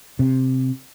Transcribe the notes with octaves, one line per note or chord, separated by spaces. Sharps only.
C3